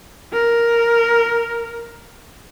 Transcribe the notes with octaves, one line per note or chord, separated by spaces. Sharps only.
A#4